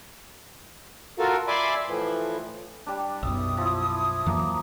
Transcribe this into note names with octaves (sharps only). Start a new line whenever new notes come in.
F4 F#4 A4 A#4 F5
D5 E5 G#5 B5 C6 D6
A2 E3 F3
G3 D4
B1 F#2 B2 E5 D#6
F3 E4
F2 E3 F#3 A#3 A#5